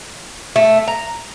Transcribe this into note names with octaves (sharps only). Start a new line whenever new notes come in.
A3
A#5